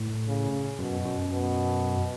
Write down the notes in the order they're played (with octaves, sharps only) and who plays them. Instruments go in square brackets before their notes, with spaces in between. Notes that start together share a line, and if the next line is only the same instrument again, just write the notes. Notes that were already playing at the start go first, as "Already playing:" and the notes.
Already playing: [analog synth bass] A2
[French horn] C#3
[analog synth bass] F#2 [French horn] B2
[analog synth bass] F#2
[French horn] B2